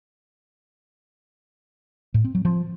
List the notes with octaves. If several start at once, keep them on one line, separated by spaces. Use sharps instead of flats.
A2
C4
F#3
F3